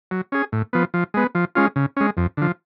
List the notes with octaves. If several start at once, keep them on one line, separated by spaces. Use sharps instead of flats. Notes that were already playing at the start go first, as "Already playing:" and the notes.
F#3
C#4 G#4
A2
F3 B3
F3
G#3 B3
F3
G#3 C#4 F4
C#3
G#3 C#4
F2
D3 F3